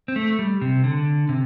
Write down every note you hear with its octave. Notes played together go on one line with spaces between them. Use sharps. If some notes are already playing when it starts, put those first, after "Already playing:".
C4
A3
G3
C3
D3
C3